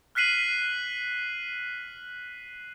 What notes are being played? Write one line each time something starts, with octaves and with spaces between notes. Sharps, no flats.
F6 F#6 B6 C7 D#7 F#7